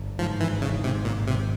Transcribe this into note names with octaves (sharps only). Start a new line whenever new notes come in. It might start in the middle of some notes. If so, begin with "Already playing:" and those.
Already playing: G1
G#2 F3
E3
G#1
C#3
G#2 C3
A#2
G#1
C3